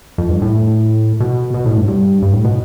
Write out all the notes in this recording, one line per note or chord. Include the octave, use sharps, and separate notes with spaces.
F2
G2
A2
B2
B2
A2
G2
G2
G2
A2
B2